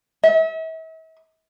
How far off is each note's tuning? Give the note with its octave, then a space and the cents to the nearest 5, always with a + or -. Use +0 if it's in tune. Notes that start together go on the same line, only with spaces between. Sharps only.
E5 -40